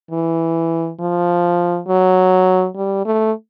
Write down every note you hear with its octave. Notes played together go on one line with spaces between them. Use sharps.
E3
F3
F#3
G3
A3